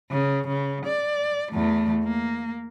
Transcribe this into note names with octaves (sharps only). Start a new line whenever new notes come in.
C#3
C#3
D5
E2 A3
A#3